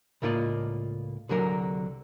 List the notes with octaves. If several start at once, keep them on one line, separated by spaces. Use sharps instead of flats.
C#2 A2 A#3 F4 D5 D#5
C2 D3 F#3 A#4